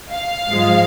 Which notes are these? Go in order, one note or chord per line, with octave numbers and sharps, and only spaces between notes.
F5
G#2 F3 G#3